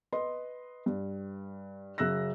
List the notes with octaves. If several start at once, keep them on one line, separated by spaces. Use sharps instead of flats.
B4 D#5 C6
G2
F#2 C#3 E6 F#6 A#6